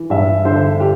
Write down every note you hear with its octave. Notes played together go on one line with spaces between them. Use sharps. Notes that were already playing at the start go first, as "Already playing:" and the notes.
Already playing: E3
G2 E5
D3 C5
G4